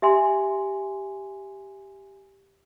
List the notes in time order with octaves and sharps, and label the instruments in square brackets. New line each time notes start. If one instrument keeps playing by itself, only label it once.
[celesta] G4 E5 G#5 C6